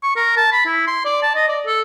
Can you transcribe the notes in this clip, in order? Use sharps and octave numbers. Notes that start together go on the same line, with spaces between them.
C#6
A#4
A5
B5
E4
C6
D5
A5
D#5
D5
A4